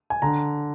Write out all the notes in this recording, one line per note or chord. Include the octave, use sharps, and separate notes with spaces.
G#5
D3 A#5